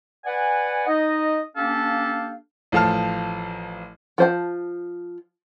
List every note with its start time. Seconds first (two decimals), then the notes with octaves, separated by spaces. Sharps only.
0.25 B4 D5 F#5 G#5
0.87 D#4 D#5
1.56 A#3 C#4 D4 G4 A4 F5
2.72 A1 F3 A4 F5 A5 F6
4.18 F3 C5 A5